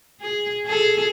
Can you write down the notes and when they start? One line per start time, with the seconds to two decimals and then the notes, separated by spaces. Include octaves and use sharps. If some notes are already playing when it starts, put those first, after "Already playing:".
0.22 G#4
0.67 G#4 A4